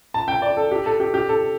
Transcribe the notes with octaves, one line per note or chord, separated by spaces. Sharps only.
A5
G5
D5
A4
G4
A4
G4
G4
A4